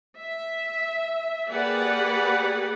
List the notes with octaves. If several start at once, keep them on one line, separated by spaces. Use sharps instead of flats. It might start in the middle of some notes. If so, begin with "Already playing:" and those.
E5
A#3 G4 G#4 B4 D5 F#5